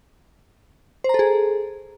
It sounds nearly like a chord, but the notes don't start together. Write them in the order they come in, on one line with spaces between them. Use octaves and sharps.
C5 A#5 A4 G#4